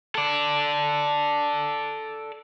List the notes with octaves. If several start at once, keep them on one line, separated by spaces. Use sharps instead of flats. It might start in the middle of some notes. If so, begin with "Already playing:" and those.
A4 D5